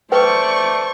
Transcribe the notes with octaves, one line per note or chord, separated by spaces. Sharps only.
A3 B4 C5 D5 G5 C#6